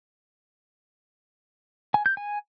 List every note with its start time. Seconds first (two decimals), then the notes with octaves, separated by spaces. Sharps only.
1.94 G#5
2.06 G6
2.17 G#5